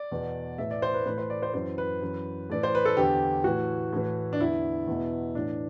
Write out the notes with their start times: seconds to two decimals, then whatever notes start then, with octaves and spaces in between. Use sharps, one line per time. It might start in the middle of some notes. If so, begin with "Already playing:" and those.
Already playing: D5
0.11 E2 B2
0.58 A2 E3 E5
0.71 D5
0.82 C5
0.94 B4
1.06 A2 E3 B4
1.18 C5
1.30 D5
1.42 C5
1.54 F#2 E3 C5
1.78 B4
2.01 F#2 E3
2.50 A2 E3 D5
2.63 C5
2.75 B4
2.85 A4
2.97 E2 D3 G4
3.44 A2 E3 F#4
3.93 A2 E3
4.33 D4
4.39 E2 D3 E4
4.87 E2 B2
5.35 A2 E3 D4